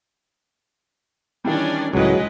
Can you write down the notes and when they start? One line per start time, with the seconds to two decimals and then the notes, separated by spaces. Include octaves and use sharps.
1.45 D#3 E3 G3 C#4 D4 D5
1.93 C#2 A2 F#3 G#3 B4 D#5